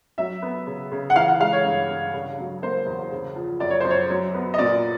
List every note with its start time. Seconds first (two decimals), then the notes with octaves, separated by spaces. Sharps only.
0.18 F#3 E5
0.42 B3
0.67 C#3
0.91 C#3
1.10 F#5
1.16 E3 F5
1.28 F#5
1.40 G#3 F5
1.53 C#5
1.65 G2
1.89 G2
2.14 C#3
2.38 F#3
2.62 A#3 C5
2.87 E2
3.12 C#3
3.36 F3
3.60 F#2 D5
3.70 C#5
3.80 F#2 C5
3.90 C#5
4.10 F#3
4.34 B3
4.54 D#5
4.58 A#2 D5